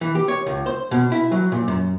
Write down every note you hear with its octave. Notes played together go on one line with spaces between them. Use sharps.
E3
G4
C#5
C#2
C5
B2
E4
F#3
A#2
F#2